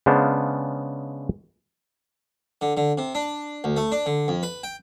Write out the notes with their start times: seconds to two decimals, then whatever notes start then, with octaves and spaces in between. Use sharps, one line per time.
0.06 C#3 G#3 B3 D4 C5 F5
2.61 D3
2.77 D3
2.98 C3
3.15 D4
3.64 D2
3.77 A3
3.92 D4
4.06 D3
4.28 F2
4.43 B4
4.63 G5